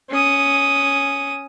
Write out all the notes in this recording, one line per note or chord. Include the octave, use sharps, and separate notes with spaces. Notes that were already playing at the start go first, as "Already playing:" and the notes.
C#4 D#6